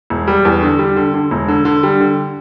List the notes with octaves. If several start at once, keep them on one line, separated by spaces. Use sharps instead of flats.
E1
G3
E2
D3
G3
D3
D3
E1
D3
D3
G3
D3